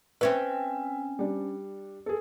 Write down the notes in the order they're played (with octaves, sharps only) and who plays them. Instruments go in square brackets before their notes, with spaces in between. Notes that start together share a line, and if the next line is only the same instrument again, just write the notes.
[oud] C4 C#4 B4 [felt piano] E5
[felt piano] G3 D4
G#4 A4